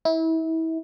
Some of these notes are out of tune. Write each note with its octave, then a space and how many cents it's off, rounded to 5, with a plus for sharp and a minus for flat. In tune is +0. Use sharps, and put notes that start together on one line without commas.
E4 -30